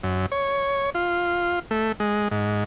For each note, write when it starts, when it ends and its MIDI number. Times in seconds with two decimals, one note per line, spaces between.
0.03 0.26 42
0.32 0.90 73
0.95 1.59 65
1.71 1.92 57
2.00 2.28 56
2.31 2.64 44